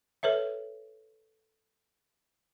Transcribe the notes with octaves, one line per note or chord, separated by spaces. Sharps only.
A4 B4 C#5 E5